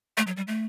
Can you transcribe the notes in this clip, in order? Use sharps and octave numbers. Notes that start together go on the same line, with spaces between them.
A3
F#3
G3
A3